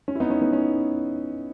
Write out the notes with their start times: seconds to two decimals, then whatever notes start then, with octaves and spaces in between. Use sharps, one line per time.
0.08 C#4
0.15 E4
0.20 B3 D#4
0.30 C#4
0.42 B3
0.53 C#4